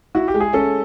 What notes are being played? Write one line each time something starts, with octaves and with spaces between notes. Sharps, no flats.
E4 F#4
G4
G#3
G#4
C#4 A4